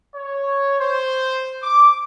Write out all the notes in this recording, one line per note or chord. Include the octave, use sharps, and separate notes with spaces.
C#5
C5
D6